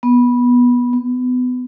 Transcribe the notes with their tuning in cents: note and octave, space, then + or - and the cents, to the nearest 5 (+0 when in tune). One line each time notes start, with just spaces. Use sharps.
B3 -15
B3 +25